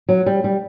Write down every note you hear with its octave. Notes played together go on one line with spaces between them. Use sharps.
F#3
G3
G3